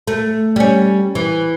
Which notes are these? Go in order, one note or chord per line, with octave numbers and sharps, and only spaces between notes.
A3
G3 C#4
E3